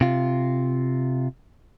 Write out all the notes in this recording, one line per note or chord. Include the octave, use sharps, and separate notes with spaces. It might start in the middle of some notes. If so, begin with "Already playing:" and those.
C3 F4